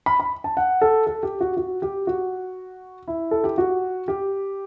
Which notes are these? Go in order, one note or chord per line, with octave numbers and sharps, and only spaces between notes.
B5
B5
A5
F#5
A4
A4
G4
F#4
F#4
G4
F#4
E4
A4
G4
F#4
G4